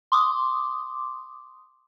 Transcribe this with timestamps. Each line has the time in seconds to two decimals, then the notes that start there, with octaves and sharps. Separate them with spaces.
0.12 C6 D6 D#6